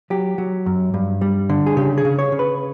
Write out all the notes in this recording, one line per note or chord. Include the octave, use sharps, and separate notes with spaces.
F#3 G4
F#3
F#2
G2
G3
D3
G#4
C#3 G4
G#4
C#3
C#5
C#3
B4